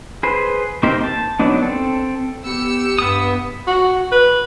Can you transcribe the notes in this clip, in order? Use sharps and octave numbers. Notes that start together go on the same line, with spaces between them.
G#4 B4 C5
A#3 C4 D#4 G4 C5
A5
F#3 B3 D4 D#4
C4 A4
B3 G4 E6 C#7
G2 B3 D#6
F#4
B4